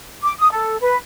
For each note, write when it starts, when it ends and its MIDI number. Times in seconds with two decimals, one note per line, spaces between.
0.22 0.33 86
0.39 0.51 87
0.52 0.78 69
0.81 0.97 71